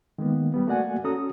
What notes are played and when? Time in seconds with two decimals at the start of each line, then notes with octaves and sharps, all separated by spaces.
0.18 D#3 G#3 A#3 B3
0.54 G3 B3
0.67 A3 A#3 F#4 D5 F#5 G#5
1.04 C#4 F#4 A4 A#5 D#6